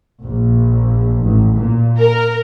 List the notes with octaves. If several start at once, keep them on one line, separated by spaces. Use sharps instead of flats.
A#1
A1
A#2
A#4